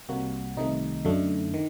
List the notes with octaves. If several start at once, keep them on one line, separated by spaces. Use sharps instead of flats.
C2 C3 G3 A#3 F#4
C2 C3 D#3 A3 D#4
F#2 D3 A3
D#3